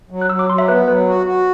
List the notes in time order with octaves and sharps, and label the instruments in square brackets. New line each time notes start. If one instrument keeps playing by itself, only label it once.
[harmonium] F#3
[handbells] F#6
[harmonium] F#3 [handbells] E6
[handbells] D6
[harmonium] F#3 [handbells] C6
[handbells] E5
[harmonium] B3 [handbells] B4
[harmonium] F#3 [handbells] B4
[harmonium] F#4
F#4